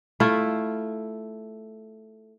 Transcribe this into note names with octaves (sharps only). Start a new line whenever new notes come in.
A3 E4 F4